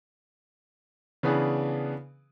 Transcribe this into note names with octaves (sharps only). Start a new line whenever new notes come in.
C#3 E3 B3 D4 G#4 B4